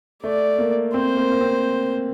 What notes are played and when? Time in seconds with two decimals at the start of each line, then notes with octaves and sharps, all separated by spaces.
0.23 A3 D5
0.58 A#3
0.94 C4 C5
1.17 A#3
1.32 A#3
1.41 C4